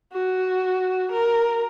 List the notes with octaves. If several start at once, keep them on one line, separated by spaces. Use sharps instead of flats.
F#4
A#4